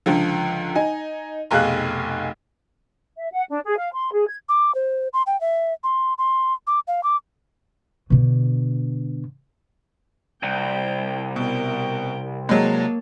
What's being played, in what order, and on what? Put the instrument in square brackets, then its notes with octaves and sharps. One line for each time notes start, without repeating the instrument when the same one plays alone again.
[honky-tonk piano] C#2 D3 F3
D#4 G#5
F1 B1 G#4 F5 F#6
[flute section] E5
F#5
D4
G#4
F5
C6
G#4
G#6
[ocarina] D6
C5
C6
G5
E5
C6
C6
D6
F5
D6
[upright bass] B2 D3
[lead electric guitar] C2 [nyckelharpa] G5
[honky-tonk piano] B2 [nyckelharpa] A#4 G5
[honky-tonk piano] F#3 G#3 [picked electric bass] A#3 [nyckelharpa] C#5 A5